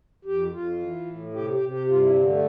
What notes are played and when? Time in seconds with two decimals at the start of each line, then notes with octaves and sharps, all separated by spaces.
0.25 F2 G4
0.52 F2 F4
0.80 E3
1.07 A2
1.33 C3 G4
1.52 G4
1.60 C3
1.70 G4
1.89 G2 F4
2.02 E4
2.15 D3 C4
2.29 A3